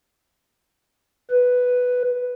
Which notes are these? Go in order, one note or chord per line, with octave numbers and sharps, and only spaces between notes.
B4